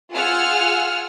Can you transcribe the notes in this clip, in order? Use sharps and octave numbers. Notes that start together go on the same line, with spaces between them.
F4 G#4 F#5 G#5 E6 F6